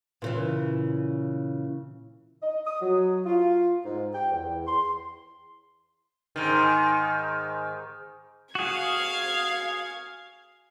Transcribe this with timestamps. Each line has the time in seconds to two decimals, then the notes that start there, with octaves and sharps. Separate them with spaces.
0.22 A#2 C#3 E3
2.42 D#5
2.67 D#6
2.81 F#3
3.26 F4
3.85 G#2
4.15 G5
4.31 E2
4.67 C6
6.36 G#2 D#3
8.55 F#4 G#4 F5 G#6